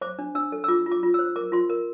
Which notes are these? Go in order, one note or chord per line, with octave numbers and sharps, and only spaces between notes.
C5 D6
D4
D4 E6
A4
E6
F4 D6
F4
D6
F4
E6
C5
A#4 D6
F4 C6
A#4